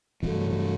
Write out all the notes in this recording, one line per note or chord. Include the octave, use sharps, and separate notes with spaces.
G2 C3 E3 F#3 A3
C3 E3